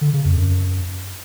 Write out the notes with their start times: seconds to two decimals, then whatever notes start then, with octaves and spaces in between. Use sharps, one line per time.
0.01 D3
0.13 C#3
0.25 F2
0.37 F#2